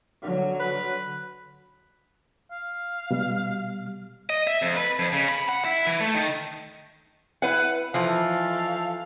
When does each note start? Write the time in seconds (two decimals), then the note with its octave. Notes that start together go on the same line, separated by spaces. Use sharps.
0.23 D3 F#3
0.60 B4
2.52 F5
3.11 B2 G3
4.30 D#5
4.47 E5
4.62 F2
4.77 B4
4.99 F2
5.13 C#3
5.28 B5
5.49 F#5
5.65 E4
5.87 E3
6.00 A3
6.14 D#3
7.42 E4 B4 F#5
7.94 E3 F3 A4 F5